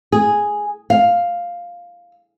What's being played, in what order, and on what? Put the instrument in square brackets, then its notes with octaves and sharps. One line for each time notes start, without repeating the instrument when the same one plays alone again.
[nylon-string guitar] G#4
F5